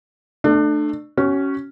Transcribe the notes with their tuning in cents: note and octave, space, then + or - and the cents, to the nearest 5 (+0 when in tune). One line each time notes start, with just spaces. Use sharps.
A3 +0 D4 +30
C#4 +0 F#4 +35